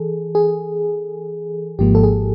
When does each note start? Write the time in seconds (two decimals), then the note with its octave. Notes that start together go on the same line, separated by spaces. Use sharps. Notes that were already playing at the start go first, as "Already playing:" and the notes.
Already playing: E3 G#4 A4
0.35 G#4
1.79 G#1 G#2 F3 A#3 G4
1.95 A4
2.03 G#4